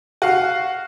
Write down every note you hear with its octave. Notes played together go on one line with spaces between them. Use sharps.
F#4 F5